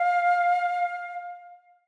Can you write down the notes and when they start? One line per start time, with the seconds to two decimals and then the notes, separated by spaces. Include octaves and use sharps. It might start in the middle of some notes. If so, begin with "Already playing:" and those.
Already playing: F5